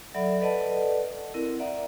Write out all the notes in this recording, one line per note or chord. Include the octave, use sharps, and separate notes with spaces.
F#3 A4 D5 E5 F#5 B5
A4 B4 D5 D#5 F#5 A5
C4 E4 A#4
D5 E5 F#5 A#5